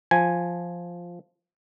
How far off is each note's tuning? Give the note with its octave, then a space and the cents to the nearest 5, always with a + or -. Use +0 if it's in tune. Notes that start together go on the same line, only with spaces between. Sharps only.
F3 +0 G#5 +0